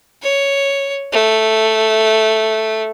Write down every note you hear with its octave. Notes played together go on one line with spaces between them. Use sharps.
C#5
A3